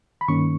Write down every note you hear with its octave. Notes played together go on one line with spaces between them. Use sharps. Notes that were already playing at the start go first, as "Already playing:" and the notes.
B5
G2 D#3 A#3 C#4 C#6